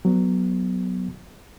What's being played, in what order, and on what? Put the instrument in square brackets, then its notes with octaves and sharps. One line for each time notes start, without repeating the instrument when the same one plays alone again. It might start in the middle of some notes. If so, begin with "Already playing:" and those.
[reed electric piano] F#3 B3